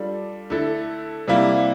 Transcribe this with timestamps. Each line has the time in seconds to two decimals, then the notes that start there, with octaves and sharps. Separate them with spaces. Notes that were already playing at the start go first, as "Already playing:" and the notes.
Already playing: G3 D4 F4 A4
0.50 D3 A3 E4 A4
1.28 C3 G3 A#3 E4